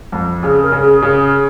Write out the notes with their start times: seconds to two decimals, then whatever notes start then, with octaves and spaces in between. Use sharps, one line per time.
0.12 F2
0.43 C#3 G#4
0.62 A#4
0.72 C#3
0.82 G#4
1.02 C#3 G#4